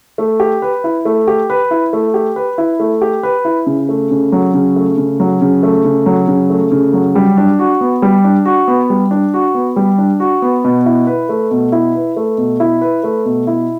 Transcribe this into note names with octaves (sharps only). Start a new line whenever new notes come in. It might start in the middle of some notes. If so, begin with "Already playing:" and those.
A3
G4
B4
E4
A3
G4
B4
E4
A3
G4
B4
E4
A3
G4
B4
E4
C#3
A3
C#3
F#3
C#3
A3
C#3
F#3
C#3
A3
C#3
F#3
C#3
A3
C#3
F#3
G3
D4
F#4
B3
G3
D4
F#4
B3
G3
D4
F#4
B3
G3
D4
F#4
B3
B2
E4
B4
A3
B2
E4
B4
A3
B2
E4
B4
A3
B2
E4